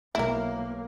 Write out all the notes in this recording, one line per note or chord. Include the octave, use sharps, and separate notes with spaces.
B1 A#3 E4 A#4